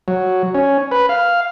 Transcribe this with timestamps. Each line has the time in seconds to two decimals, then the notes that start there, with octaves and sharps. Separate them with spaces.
0.08 F#3
0.55 C#4
0.91 B4
1.09 F5